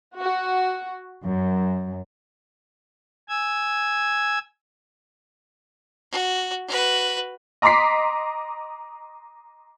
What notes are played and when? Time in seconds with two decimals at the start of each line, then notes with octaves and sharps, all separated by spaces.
0.18 F#4
1.25 F#2
3.29 G#5 E6 G#6
6.12 F#4
6.68 F#4 B4
7.62 D#5 A#5 C6 D6 B6 C7